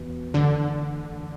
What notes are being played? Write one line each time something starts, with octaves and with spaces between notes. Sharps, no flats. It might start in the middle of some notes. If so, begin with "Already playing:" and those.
Already playing: E2 E3 B3 F#4 B4
F#2 D3 E3 A3